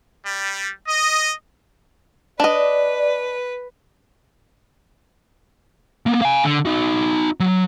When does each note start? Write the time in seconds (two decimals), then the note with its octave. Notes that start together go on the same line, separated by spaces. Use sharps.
0.24 G3
0.87 D#5
2.40 D4 B4 D5 D#5
6.06 A#3 B3
6.22 F5 G#5
6.44 D3
6.66 D#4 F#4
7.40 F#3